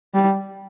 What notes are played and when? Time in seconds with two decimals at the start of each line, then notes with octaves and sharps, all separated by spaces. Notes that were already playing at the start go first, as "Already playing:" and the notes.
0.14 G3